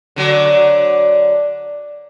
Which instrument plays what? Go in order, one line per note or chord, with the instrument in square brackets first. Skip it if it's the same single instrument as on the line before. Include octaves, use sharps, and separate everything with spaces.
[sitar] D3 F#3